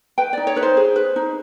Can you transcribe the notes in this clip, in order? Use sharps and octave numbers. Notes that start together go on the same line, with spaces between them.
B4 G5
D#4 D5
C#5
D#4 B4
C5
G#4
B4
D#4